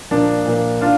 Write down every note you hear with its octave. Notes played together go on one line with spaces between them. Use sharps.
A#2 F3 A#3 D4
A#2 F3 A#3
D4 F4